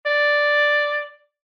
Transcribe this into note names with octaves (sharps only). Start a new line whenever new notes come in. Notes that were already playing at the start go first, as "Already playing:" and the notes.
D5